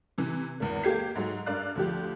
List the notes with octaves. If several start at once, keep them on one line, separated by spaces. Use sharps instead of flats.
C3 E3
G#1 E2
G#3 A#3 G4 G#6 C7
G#2 F#3 G#3
G2 A#4 D5 F5 F#6
D2 F3 G4